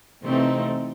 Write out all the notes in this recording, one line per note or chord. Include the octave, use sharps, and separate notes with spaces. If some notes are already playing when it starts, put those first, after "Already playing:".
C3 E3 A3 C4 D#4